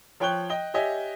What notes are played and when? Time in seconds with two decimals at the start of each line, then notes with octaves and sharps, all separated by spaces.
0.20 F3 C#5 G5 C#6 F#6 G7
0.50 D#5 G5 G7
0.74 G4 C#5 D#5 E5 G#5